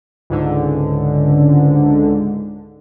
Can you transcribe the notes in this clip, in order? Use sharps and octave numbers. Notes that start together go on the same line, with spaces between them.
C#2 G#2 D3